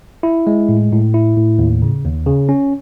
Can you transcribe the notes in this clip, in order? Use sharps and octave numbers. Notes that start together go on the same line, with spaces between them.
E4
G#3
A2
A2
E4
A2
D#2
C#3
D#2
C#3
C#4